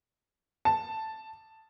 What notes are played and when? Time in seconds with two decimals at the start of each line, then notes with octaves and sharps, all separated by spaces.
0.65 A5